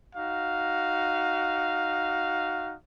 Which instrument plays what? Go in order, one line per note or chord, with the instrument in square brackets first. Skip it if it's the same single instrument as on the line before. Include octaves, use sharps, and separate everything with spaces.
[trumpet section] D#4 F#4 F5